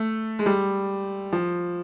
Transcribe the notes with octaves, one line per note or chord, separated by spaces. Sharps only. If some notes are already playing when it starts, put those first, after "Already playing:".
Already playing: A3
G#3
G3
F3